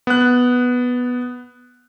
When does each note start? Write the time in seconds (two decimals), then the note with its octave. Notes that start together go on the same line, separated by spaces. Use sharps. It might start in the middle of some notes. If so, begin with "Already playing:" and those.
0.07 B3 F#6